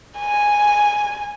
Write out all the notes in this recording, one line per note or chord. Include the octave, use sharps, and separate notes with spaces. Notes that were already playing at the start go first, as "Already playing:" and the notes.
G#5